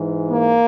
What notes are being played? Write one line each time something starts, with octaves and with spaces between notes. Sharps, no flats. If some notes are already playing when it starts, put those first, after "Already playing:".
Already playing: G#2 E3
A#3